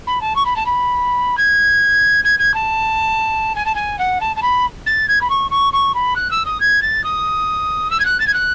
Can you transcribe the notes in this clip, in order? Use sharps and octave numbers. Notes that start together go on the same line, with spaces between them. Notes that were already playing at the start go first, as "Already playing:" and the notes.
B5
A5
C#6
B5
A5
B5
G#6
G#6
G#6
A5
G#5
A5
G#5
F#5
A5
A5
B5
A6
G#6
B5
C#6
C#6
C#6
B5
F#6
E6
D#6
G#6
A6
D#6
E6
G#6
F#6
A6
G#6
F#6